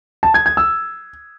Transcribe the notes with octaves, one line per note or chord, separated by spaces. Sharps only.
A5
G#6
G#6
E6